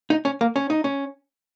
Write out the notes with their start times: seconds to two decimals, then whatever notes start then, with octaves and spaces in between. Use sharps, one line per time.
0.10 D#4
0.25 C#4
0.41 A#3
0.56 C#4
0.70 D#4
0.84 C#4